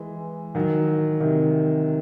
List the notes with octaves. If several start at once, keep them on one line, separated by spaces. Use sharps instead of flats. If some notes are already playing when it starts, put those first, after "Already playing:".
Already playing: E3 G#3
D#3 F#3
C3 D#3